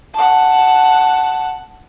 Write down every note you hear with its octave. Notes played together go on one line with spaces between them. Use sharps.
F#5 A5